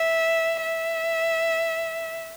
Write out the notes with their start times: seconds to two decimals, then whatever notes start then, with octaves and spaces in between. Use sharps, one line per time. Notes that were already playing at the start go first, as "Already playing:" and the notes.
Already playing: E5
0.62 E5